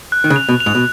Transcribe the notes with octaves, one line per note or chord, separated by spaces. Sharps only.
F#6
D#3
C#3
F7
B2
F7
G#2
B2